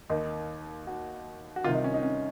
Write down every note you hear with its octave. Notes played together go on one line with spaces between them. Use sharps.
D#2 D#3 D#4
F#4
F#4
C2 C3 D#3 F4
D#4
C#4
D#4
C#4